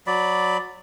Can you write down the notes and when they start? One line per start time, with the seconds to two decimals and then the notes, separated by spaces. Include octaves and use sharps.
0.07 F#3 D5 B5